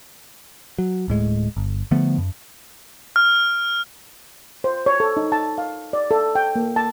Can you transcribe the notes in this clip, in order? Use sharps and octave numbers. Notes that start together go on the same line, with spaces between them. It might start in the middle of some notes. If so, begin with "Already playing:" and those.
F#3
D1 A2 G#3
G1
D3 F3 A3 B3
F#2
F6
C5
C#5
A4
D#4
A5
F5
D5
A4
G5
A#3
A5